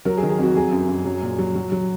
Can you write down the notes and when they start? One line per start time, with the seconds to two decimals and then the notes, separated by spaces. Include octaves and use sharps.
0.05 F#3 A#4
0.17 G#4
0.23 D#3
0.30 G#4
0.38 F2 F#4
0.55 F#3 G#4
0.72 F#2
0.88 F#2
1.05 F#3
1.23 A#2
1.39 F#3
1.55 F#3
1.72 F#3